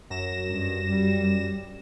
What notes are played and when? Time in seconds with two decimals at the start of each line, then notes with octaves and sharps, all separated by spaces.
0.10 F#2 A#6 E7
0.48 G2
0.91 G3